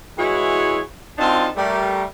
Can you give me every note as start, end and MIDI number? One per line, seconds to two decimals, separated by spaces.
0.17 0.79 52
0.17 0.79 56
0.17 0.79 64
0.17 0.79 66
0.17 0.79 68
0.17 0.79 73
1.18 1.48 42
1.18 1.48 60
1.18 1.48 62
1.18 1.48 63
1.18 1.48 65
1.18 1.48 81
1.56 2.02 55
1.56 2.02 57
1.56 2.02 70